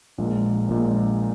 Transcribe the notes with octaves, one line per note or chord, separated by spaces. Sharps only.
A#1 A#2 G#3
A#1 A#2 G#3